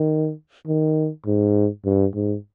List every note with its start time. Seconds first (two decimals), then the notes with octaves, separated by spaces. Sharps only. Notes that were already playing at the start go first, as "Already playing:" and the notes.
Already playing: D#3
0.67 D#3
1.26 G#2
1.85 G2
2.15 G#2